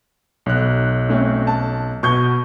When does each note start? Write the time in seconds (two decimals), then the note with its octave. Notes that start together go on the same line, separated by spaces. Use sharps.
0.46 B1 F#6
1.09 A3 C4 C#4
1.47 A5
2.03 B2 C#6 G6